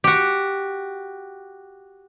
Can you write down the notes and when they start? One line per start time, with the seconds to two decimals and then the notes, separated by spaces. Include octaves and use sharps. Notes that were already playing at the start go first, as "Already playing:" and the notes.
0.04 F#4 G4